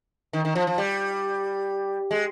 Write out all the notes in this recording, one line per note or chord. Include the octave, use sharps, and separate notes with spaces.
D#3
D#3
F3
F3
G3
G#3